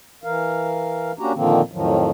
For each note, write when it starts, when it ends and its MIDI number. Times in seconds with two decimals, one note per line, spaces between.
0.24 1.12 52
0.24 1.12 70
0.24 1.12 77
1.19 1.32 58
1.19 1.32 61
1.19 1.32 62
1.19 1.32 66
1.19 1.32 67
1.19 1.32 82
1.34 1.61 46
1.34 1.61 50
1.34 1.61 51
1.34 1.61 53
1.34 1.61 58
1.34 1.61 60
1.72 2.11 41
1.72 2.11 45
1.72 2.11 51
1.72 2.11 53
1.72 2.11 54